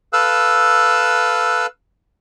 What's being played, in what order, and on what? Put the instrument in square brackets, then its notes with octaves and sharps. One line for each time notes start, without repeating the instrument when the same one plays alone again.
[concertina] A4 B4 F5 E6 F#6